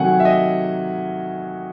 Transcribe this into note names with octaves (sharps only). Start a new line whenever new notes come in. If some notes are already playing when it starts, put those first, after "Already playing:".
Already playing: C3 D#3 F#3 A3 F#5 G#5
E5
D#5